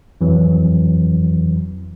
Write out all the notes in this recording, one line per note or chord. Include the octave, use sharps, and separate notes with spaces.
F2 E3 F#3